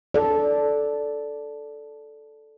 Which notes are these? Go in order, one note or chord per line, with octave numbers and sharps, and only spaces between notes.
A4 D5